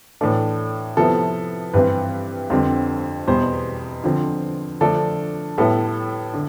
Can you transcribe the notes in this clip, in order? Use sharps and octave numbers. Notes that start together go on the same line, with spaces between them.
A2 E3 A3 D4 A4
C3 F3 B3 E4 A4
G2 E3 G3 C4 E4 B4
F2 D3 G3 C4
E2 B2 G3 C5
D3 F3 C4
D3 F3 A3 D4 A4
A2 G3 B3 E4 A4
D3